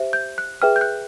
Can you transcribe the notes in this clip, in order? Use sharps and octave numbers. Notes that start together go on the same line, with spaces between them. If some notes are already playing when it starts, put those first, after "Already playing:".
Already playing: G4 C5 E5
G6
F#6
G#4 B4 E5 G5 F6
G6
F#6